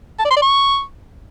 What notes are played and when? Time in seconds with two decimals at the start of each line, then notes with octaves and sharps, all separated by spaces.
0.20 A5
0.25 D5
0.31 C6
0.37 D5
0.42 C#6